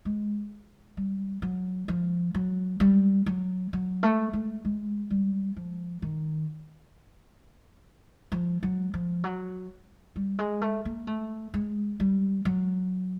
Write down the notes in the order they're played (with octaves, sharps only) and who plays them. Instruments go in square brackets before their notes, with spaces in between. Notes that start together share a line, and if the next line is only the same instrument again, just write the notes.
[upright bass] G#3
G3
F#3
F3
F#3
G3
F#3
F#3
A3
A3
G#3
G3
F3
D#3
F3
F#3
F3
F#3
G3
G#3
A3
A#3
A3
G#3
G3
F#3